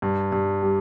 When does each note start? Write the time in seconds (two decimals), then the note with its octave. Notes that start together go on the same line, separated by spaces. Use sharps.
0.02 G2
0.32 G2
0.62 G3